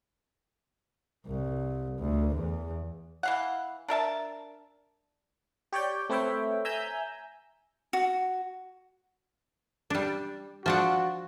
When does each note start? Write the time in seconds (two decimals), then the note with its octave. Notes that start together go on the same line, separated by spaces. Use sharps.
1.27 C2
1.99 D2
2.35 E2
3.23 E3 F5 F#5
3.88 D4 A#4 E5 A5
5.73 G4 C#5 D5 G5
6.09 A3 C4 B4 C#5 E5 G5
6.65 E5 G#5 A#5 E6 G6
7.93 F#4
9.90 G3 D4
10.66 F3 D4 F#4 F#5